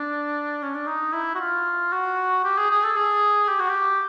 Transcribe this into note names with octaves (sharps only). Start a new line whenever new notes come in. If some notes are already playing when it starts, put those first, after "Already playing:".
Already playing: D4
C#4
D4
D#4
E4
F#4
F4
F#4
G4
G#4
G#4
A4
G#4
G4
F#4
G4